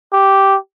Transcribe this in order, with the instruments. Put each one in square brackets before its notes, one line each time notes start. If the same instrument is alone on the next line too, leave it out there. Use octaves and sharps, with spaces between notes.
[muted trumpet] G4